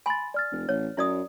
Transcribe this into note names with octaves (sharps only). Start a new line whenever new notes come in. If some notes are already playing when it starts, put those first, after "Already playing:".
G#5 B5 C6 A6
D5 F6 A6
F1
A1 C#5
F#2 E4 D5 D#6